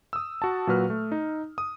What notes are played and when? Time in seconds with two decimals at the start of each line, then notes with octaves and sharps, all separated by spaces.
0.13 D#6 E6
0.42 F#4 A5
0.67 A#2 F#3 F#4 B4 F6
0.90 A3
1.12 D#4
1.58 D#6